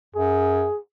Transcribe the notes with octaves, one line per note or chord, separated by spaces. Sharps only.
F#2 G#4